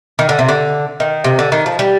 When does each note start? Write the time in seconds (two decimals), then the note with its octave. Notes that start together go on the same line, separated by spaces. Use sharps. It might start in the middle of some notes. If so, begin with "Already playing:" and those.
0.19 D#3
0.29 D3
0.39 C3
0.49 D3
1.00 D#3
1.24 C3
1.39 D3
1.52 D#3
1.66 F3
1.79 G3